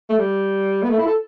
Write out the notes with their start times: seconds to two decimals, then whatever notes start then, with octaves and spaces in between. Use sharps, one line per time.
0.10 A3
0.18 G3
0.83 B3
0.90 A3
0.98 E4
1.06 A4